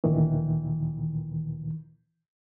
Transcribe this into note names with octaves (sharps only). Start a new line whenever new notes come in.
D2 A#2 D#3 E3